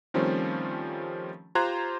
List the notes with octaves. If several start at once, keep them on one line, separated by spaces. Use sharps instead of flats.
D#3 F3 G3 A3 C4 C#4
F4 G4 C5 A#5 F#6 G#6